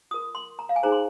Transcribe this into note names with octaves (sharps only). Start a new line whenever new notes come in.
F4 A#4 D#6
C6
A#5
F5
G#5
D#4 G#4 C5 A#5
C6